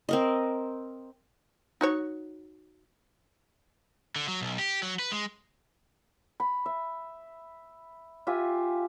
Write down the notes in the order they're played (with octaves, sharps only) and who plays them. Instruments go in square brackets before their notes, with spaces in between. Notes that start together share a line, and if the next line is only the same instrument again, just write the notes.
[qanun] C4 A#4 D#5
[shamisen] D#4 F#4 C#5
[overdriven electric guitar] D3
F#3
B1
G4
F#3
B4
G#3
[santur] B5
E5
F4 G4 E5 G#5